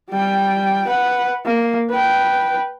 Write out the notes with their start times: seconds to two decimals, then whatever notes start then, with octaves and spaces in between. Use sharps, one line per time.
0.10 G3 G5
0.87 B4 F#5
1.45 A#3
1.90 B4 G5